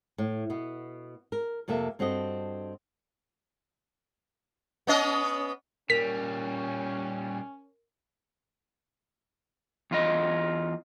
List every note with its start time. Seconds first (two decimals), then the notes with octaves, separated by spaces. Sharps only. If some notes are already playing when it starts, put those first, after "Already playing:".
0.18 A2
0.50 B2 B3
1.32 A#4
1.68 F2 C3 A#3 A4 E5
1.99 G2 C4 F#4 A4 D#5
4.87 B3 C#4 D#5
5.90 A#2 G3 C#4 A#4 B6 F7
9.91 E2 F4 D#5